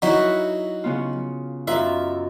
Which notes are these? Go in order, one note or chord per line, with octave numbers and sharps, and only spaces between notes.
F#3 D#4 E4 F#4 E5
C#3 B3 F4
F#2 D#4 F4 B4 E5